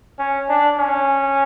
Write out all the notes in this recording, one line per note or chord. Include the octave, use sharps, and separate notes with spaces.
C#4
D4
C#4